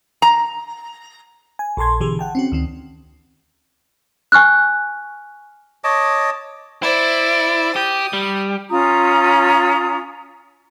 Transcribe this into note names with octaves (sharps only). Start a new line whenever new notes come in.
A#5
G#5
A#1 A4 A5 C6 G#6
B2 D3 E3 G4 G#4
F#5 G5 A5
C4 C#4 F#4
D2 D#3 C4
G#5 C#6 F6 F#6
C#5 D#5 A5 D6
E4 C5 D5
G4 D#6
G3
C#4 F4 A#5 D#6